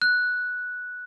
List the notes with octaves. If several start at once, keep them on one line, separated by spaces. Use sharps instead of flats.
F#6